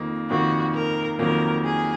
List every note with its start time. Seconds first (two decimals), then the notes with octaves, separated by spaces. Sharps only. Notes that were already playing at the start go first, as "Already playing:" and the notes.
Already playing: F2 D#3 A#3
0.30 F2 D#3 A#3 F#4
0.74 A#4
1.19 F2 D#3 F#3 A#3 A#4
1.64 G#4